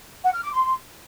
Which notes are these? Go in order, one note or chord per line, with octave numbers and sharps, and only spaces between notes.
F#5
F6
D6
C6